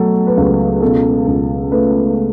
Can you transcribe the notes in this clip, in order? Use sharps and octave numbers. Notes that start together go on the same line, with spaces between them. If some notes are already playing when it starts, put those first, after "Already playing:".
Already playing: B2 F#3 A3 A4
B4
C#2 A4
B2 A4
C#2
A3 B4